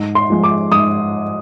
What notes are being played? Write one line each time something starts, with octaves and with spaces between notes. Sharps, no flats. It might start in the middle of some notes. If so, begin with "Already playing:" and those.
Already playing: G#2
C6
F3 G#3
D6
G#2 D#6